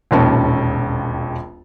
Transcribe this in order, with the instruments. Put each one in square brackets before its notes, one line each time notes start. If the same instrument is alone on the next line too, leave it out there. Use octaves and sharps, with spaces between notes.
[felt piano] E1 A#1 D#2 C#4 A5